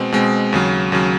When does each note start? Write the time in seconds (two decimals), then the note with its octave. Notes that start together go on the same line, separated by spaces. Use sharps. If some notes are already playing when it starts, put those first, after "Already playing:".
Already playing: B2 G#3 C4
0.12 B2 G#3 C4
0.53 D#2 C#3 F#3
0.92 D#2 C#3 F#3